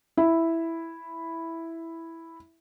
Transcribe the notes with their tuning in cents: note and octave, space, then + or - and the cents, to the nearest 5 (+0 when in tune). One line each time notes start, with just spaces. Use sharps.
E4 +0 E5 +0